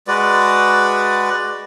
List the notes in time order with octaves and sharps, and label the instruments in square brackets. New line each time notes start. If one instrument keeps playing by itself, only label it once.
[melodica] G#3 F#4 B4 D5